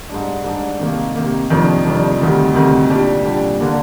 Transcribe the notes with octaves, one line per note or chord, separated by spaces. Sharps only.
G#2 G3 D4
G#2 G3 D4
C3 D#3 A#3
C3 D#3 A#3
F1 F2 D#3 G3 D4
F1 F2 D#3 G3 D4
D2 C3 D#3 G3
D2 C3 D#3 G3
A#2 G3 D4 G4
A#2 G3 D4 G4
D3 G3 A#3 D4